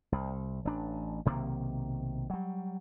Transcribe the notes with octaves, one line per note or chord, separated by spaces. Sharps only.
C2
A1 D4
B1 C3 D#3 A#3
F#3 G3